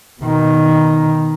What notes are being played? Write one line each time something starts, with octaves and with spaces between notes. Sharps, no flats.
B2 D#3